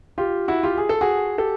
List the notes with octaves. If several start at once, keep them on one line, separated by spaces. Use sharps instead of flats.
F4 G4
E4 F#4
F4 G4
G#4
A4
F#4 G#4
G4 A4